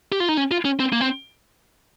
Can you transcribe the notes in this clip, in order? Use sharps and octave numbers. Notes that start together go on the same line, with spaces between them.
G4
F4
D#4
C#4
F4
C#4
C4
A#3
C4